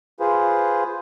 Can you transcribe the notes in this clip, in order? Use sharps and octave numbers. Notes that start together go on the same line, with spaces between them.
F4 G#4 B4 C5